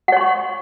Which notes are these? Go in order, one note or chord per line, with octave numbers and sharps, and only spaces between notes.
C#5 F#5 C6 C#6